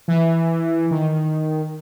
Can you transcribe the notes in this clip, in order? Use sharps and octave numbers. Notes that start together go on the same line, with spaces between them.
E3
D#3